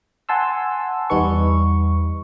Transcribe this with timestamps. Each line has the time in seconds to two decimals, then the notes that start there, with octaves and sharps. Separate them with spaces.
0.29 F#5 G#5 A5 C6 E6
1.10 E2 G3 D#4 B4 C#6